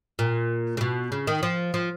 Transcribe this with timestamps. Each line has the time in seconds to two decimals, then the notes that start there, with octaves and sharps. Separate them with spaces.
0.19 A#2
0.77 C#3
0.81 B2
1.12 C#3
1.27 D#3
1.43 F3
1.74 F3